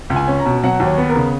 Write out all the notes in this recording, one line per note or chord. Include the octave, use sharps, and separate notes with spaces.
C#2
G#5
C#4
A#5
B2
F#3 F#5
D#2
C#5
B3
A#4
C#3